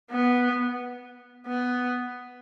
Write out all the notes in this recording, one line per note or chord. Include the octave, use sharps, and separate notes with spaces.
B3
B3